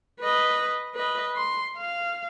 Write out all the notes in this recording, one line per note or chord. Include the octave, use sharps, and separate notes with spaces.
B4 D#5
B4 D#5
C6
F5